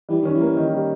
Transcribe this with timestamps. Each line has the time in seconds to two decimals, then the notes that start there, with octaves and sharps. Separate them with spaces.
0.09 E3 G3
0.22 D#3 C#4
0.34 E3
0.41 A#3
0.57 D#3
0.73 G3